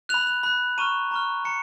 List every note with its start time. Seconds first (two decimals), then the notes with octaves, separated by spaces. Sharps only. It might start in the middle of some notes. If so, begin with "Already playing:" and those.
0.09 B5 F#6 F7
0.27 F7
0.43 B5 F#6
0.78 A#5 C#6 F6 D#7
1.11 A#5 C#6 F6
1.45 A#5 C#7